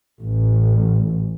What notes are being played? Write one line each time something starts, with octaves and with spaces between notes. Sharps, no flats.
A1